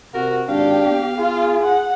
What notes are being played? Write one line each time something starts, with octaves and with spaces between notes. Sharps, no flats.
C3 F#4 A#4
G#1 D4 G4 F5
B3
F4 G#4
F#5